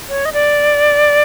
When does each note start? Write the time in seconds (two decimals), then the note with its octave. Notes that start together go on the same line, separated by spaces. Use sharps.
0.09 C#5
0.25 D#5
0.33 D5